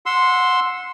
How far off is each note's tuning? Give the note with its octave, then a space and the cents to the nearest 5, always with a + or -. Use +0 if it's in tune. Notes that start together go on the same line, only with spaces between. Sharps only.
F#5 -25 C6 +0 E6 +0